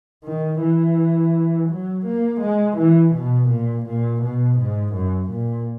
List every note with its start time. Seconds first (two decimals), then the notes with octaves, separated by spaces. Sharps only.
0.24 D#3
0.61 E3
1.70 F#3
2.06 A#3
2.41 G#3
2.77 E3
3.14 B2
3.49 A#2
3.86 A#2
4.22 B2
4.59 G#2
4.94 F#2
5.30 A#2